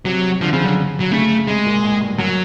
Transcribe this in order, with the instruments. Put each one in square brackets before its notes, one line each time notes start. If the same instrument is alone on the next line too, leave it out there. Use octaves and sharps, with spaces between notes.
[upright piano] C3 [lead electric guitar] F#3
[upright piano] D3 [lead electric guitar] F3
[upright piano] C#3 [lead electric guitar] F3
[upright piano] D3 [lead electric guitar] F#3
[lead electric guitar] F#3
[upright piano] C#3 [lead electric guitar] A3
[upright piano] C3 [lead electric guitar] G#3
[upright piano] A#2
A2
G2
[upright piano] F#2 [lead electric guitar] F#3